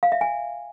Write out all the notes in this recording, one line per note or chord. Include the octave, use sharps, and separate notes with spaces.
F5
E5
G#5